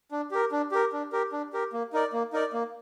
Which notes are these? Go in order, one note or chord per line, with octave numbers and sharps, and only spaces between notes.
D4
G4 A#4
D4
G4 A#4
D4
G4 A#4
D4
G4 A#4
A#3
D#4 A#4 D5
A#3
D#4 A#4 D5
A#3